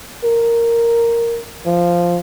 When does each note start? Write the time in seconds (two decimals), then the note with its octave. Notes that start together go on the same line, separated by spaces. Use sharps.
0.24 A#4
1.66 F3